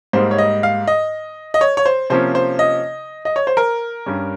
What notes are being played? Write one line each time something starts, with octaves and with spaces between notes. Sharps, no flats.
G#2 G3 A#3 D#4 C5
C#5
D#5
F5
D#5
D#5
C#5
C#5
C5
C3 F3 A#3 C#4 C5
C5
D#5
D#5
C#5
C5
A#4
G2 G3 C#4